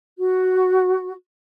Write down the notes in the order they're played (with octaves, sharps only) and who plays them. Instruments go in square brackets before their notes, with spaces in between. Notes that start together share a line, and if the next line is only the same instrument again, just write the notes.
[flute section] F#4